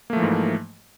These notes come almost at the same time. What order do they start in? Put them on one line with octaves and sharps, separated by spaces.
A#3 A3 F3 E3 G#2